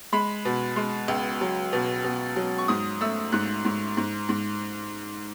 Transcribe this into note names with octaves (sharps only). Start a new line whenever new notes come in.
G#3 B5
B2
G#3
C#2
F#3
B2
B2
F#3
C#6
G#2 D#6
A3 E6
G#2 F#6
G#2
G#2
G#2